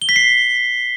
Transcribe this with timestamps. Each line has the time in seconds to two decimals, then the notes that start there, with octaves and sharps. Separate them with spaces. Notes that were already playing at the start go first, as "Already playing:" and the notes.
0.02 G7
0.09 B6
0.16 C7